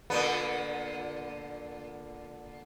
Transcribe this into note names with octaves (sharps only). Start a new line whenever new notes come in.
A#2 D3 B3